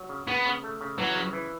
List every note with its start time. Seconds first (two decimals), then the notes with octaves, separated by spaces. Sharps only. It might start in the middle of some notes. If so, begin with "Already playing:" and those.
Already playing: F#3
0.09 C#3
0.27 C#3 B3
0.46 C#3
0.63 A3
0.81 C#3
0.98 E3 F#3
1.15 C#3
1.33 E3